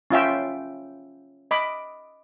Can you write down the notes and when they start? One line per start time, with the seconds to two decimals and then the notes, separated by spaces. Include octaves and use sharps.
0.11 C#4 F4 E5 G5
1.51 D#5 B5 D6